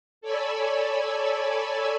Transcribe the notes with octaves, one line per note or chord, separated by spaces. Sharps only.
A4 C#5 D5 G#5 B5 E6